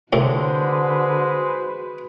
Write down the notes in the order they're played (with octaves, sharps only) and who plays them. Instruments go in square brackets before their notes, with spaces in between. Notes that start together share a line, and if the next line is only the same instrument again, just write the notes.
[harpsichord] C2 A2 [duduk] D3 [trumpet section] G#3 C5 [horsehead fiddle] F#4 B4